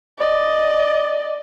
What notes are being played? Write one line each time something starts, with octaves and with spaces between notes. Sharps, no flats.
D5 D#5